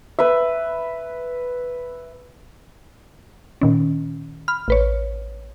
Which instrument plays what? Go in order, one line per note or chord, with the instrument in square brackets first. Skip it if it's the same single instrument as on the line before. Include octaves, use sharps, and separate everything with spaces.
[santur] B4 E5
[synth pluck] A#2 D#3 C#4
B5 F6
A1 B4 C#5